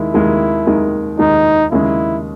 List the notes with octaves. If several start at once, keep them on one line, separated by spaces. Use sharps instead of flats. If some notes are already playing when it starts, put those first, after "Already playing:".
Already playing: D#2 D#3 G#3 E4
D#2 D#3 G#3
D#2 D#3 G#3
D#2 D#3 G#3 D#4
D#2 C#3 G#3 E4